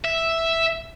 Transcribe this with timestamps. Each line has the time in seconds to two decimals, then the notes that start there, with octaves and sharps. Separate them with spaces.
0.04 E5